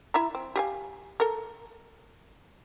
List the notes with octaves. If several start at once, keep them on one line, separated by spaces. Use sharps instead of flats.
E4 E5 A#5
C4
G4 F5 G#5
A4 A#4